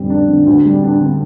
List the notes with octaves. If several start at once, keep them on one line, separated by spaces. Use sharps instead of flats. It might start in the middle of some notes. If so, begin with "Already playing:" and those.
Already playing: F2 D3 G3
D4
D3
D2
G3
D4
D3